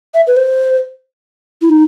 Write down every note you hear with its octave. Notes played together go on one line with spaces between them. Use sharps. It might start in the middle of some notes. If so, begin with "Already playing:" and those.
E5
B4
C5
E4
D#4